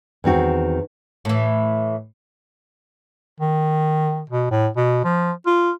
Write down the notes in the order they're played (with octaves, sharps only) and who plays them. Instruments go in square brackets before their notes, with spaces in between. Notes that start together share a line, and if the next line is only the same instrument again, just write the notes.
[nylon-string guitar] E2 D#3 C4 F#4
[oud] A2 E3
[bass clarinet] D#3
B2
A2
B2
F3
F4